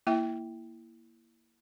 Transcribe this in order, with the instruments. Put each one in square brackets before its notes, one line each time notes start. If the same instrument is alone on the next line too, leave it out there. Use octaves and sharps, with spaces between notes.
[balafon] A#3 E4 E5 G5